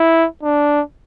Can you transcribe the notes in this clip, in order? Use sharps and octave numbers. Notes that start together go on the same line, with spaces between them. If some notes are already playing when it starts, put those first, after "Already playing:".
Already playing: E4
D4